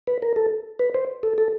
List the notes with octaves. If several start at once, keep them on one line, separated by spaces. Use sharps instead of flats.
B4
A#4
A4
B4
C5
A4
A4